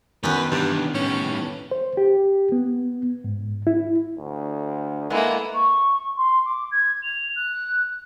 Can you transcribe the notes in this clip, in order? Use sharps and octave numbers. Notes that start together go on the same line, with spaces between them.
F#2 D#3 B3 B4
G2 E3 D4
A2 G3 C#4
C5
G4
B3
G#2
E4
D2
G#3 A#3 B3 E4 A4
C#6
C6
D6
G#6
F7
F#6